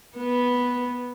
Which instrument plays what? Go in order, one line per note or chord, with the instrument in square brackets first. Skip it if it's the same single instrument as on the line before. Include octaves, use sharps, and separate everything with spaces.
[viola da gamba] B3